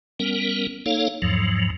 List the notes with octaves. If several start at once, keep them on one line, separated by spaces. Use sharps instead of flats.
G3 B3 C#4 A#4
A#3 D#4 A4 C#5 F5
E2 G#2 F3 F#3